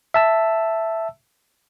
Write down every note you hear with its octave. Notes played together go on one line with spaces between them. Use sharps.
E5 A5 E6